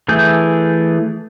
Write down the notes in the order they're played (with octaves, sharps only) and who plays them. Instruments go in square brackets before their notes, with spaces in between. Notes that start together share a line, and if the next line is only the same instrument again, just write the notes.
[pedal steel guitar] E3 A3 G#4 G6